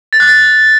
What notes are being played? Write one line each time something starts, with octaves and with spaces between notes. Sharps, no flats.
A6
F#6
A6